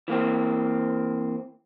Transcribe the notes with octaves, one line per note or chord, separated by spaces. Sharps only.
E3 A#3 C4